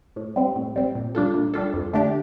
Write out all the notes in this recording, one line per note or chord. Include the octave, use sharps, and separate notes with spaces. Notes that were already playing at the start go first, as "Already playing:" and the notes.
A2
G3 C4
A2
G3 C4
A#2
G3 D4 F4 A4
A#2
G3 D4 F4 A4
F2
D3 A3 D4 G4